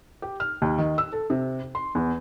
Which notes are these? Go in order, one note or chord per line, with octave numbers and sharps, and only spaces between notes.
G4
F6
D#2
D#3
E6
A4
C3
C6
E2